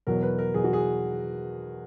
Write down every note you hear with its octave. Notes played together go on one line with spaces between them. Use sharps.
E2 B2 F#3 A#4
B4
A#4
E2 B2 F#3 G#4
F#4
G#4